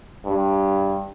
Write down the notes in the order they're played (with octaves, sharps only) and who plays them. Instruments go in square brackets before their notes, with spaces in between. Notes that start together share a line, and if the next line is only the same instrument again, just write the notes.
[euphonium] G2